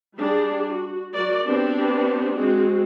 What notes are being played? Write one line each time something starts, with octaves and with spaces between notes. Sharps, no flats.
G3 D4 G#4
F#4
F#3 F#4 A#4 D5
B3 C4 D4 G4
G#3 C4 F#4